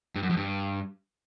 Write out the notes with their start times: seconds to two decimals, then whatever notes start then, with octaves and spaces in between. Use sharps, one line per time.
0.15 G2
0.23 F#2
0.30 F2
0.37 G2